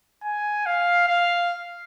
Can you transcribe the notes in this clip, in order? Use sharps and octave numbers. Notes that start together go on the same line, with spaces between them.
G#5
F5
F5